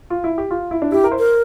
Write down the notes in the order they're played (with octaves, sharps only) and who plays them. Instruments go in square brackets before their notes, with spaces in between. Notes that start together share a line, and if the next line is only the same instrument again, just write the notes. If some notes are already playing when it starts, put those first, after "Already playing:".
[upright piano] F4
E4
G4
F4
E4
D4
[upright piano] E4 [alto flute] G4
[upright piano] A#4
C5
[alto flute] A#4